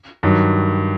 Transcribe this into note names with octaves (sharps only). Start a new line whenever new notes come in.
G2 D#3 F#3